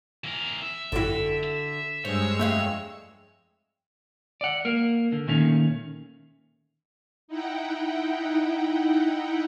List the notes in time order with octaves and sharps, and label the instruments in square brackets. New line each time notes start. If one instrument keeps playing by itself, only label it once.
[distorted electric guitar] E3 A#4
E5
[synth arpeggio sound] G#1 F#2 E4 [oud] D3 F#4
[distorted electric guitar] E5
[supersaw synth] G2 G#3 E6 [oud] C5 [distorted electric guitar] C#5
[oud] F2 E5 F5 [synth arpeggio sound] A3 F#6
[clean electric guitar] D5 F#5
A#3 A#4
D3
A#2 D#3 A3 A#3 C#4
[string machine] D#4 E4 F#5 G5